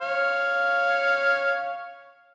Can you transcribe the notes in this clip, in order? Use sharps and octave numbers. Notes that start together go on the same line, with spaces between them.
C#5 F5